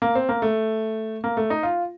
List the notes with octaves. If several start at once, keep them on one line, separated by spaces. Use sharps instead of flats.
A#3
C4
A#3
A3
A#3
A3
D#4
F4